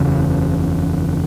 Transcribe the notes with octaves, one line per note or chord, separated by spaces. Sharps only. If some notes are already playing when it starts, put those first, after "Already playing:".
Already playing: F#1 E2 C#3